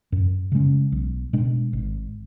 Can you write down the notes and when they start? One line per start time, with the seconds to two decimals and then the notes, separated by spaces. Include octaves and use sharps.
0.12 F#2
0.52 C#3 G#3 C#4
0.92 B1
1.33 B2 G#3 D4
1.73 G#1